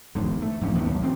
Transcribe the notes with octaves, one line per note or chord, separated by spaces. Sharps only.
E1 G#2 D3
A3
G#2 F3 G3 C#4
D#2 A2 D#3 B3
B1
D2 C4